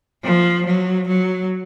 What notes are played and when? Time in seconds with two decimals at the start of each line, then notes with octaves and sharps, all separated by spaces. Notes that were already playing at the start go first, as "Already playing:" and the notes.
0.23 F3
0.65 F#3
1.07 F#3